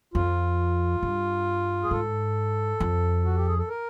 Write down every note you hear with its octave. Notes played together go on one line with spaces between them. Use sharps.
F2 F4
G2
G#4
G#2 A4
F2
F#4
G4
G#4
A4
A#4